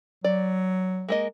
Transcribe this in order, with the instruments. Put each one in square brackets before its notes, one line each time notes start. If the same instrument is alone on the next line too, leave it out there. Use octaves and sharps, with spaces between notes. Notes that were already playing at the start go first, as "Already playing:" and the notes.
[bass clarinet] F#3 [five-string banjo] D5
[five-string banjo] G#3 A#3 D#5